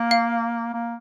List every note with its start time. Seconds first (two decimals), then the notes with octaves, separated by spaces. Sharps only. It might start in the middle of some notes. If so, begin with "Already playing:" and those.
Already playing: A#3
0.11 F5
0.74 A#3